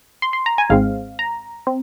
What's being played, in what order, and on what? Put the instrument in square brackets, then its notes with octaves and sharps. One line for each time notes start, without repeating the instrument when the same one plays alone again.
[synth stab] C6
C6
A#5
G#5
G#1 G#2 G#3 C4 F5
A#5
C4